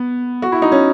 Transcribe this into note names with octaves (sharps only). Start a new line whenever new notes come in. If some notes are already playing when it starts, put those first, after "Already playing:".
Already playing: B3
F#4
E4
D#4
C#4